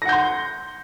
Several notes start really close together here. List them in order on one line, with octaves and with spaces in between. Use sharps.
A#6 F#5 G6 C6